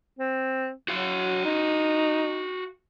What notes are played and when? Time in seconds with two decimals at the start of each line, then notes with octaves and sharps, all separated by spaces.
0.19 C4
0.88 F#3 F#4 F5
1.45 D#4